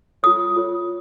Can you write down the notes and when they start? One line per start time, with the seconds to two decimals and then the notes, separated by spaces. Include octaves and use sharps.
0.23 F4 A4 C#5 D#6
0.56 F4 A4 C#5